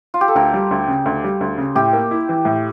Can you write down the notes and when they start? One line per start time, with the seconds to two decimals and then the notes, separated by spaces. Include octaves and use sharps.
0.14 F4
0.21 G4
0.28 A4
0.35 D2 A#4
0.54 G3
0.71 D2
0.88 C#3
1.06 D2
1.24 G3
1.41 D2
1.58 C#3
1.76 A2 G4
1.93 A#3
2.11 E4
2.29 E3
2.45 A2